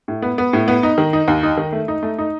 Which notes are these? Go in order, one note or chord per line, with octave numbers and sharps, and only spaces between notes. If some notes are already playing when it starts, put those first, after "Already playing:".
A2
B3
B3
A2
B3
D#4
D#3
D#4
D#2
D#4
D#3
A3
D#4
A3
D#4